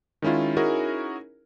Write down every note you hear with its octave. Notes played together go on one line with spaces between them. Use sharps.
D#3 G#3 C#4 E4 F4
C#4 D#4 E4 F#4 G#4 A#4